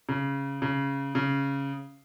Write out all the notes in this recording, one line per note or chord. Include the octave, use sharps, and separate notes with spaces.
C#3
C#3
C#3